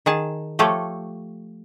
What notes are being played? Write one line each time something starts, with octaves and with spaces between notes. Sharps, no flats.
D#3 G#4 A5
F3 A3 G4 A4 C#5